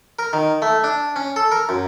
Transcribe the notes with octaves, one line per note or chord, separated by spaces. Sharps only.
A#4
D#3
A3
D4
C#4
A4
A#4
F#2